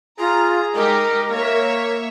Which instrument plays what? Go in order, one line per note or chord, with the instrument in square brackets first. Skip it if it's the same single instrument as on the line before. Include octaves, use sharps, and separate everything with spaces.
[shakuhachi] F4 [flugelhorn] G#4 [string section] A#5
[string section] G#3 D#4 G4 [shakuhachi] A#4
[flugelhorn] A#3 [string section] C#5 E5